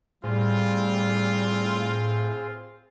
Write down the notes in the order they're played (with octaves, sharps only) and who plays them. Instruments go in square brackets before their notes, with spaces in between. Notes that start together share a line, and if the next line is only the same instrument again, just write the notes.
[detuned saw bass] A2 [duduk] G3 [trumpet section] C4 F4 [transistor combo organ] G#4 C5